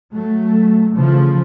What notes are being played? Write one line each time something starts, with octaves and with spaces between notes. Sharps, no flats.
F#3 A3
C#3 E3 F3 A3